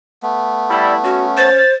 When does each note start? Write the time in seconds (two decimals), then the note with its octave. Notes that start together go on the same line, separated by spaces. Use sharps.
0.23 A3 B3
0.71 G3 E4 D5
1.04 C#4 F#4
1.37 C5 A6